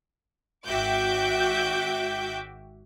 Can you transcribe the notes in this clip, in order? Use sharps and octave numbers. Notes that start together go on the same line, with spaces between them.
G#1 F#4 E5 G5 D6 G6